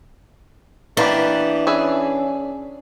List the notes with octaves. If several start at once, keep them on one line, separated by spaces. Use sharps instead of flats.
E3 A#3 B3 D4 G4
C#4 G#4 B4 E5